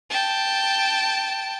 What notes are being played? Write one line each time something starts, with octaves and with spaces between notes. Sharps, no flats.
G5 A5